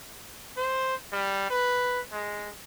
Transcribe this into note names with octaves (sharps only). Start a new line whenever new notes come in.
C5
G3
B4
G#3